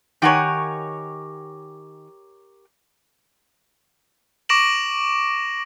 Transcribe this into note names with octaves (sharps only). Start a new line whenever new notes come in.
D#3 G4 A#4 C#5 F#5 G#5
C#6 D6 A#6 D7 E7 F#7